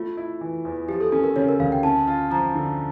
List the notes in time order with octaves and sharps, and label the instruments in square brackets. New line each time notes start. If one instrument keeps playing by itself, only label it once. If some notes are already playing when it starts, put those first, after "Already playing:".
Already playing: [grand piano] A3 [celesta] F4
[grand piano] E4
E3
E2
[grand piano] F3 [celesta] G4
[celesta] A4
[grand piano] C#4 [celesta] A4
[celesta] A#4
[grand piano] C#3 [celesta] C#5
[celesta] A#4
[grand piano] D2 [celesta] F5
[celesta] G5
[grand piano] C#4 [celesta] A5
[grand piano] F4
[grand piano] F3 [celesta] A#5
[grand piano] D3